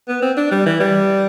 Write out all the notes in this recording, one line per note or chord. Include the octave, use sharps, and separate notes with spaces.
B3
C4
D4
G3
E3
G3